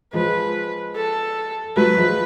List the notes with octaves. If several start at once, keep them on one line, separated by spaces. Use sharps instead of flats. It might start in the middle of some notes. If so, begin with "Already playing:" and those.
F3 G#3 B4
A4
F#3 A3 B4
F3 G#3